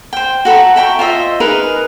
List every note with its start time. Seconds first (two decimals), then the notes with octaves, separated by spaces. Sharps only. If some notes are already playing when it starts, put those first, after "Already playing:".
0.13 C5 G5
0.45 F#4 A4 A#5 B5
0.76 E5 G5 A#5 C#6
0.99 F4 C5 D#5 E5
1.40 D#4 G#4 A#4 B4